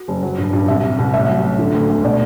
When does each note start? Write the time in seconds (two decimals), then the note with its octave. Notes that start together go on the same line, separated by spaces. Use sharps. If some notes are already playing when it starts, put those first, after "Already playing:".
Already playing: F#4
0.08 F#1
0.23 F#3
0.38 G2
0.53 G2
0.68 C2 E5
0.83 C3
0.99 C2
1.14 A1 E5
1.28 F#3
1.44 A1
1.59 D3
1.74 D2
1.90 D2
2.04 B2 D5